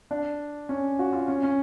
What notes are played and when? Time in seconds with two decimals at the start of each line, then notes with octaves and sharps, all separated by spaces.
0.11 D4
0.69 C#4
0.99 F#4
1.13 F4
1.28 C#4
1.43 C#4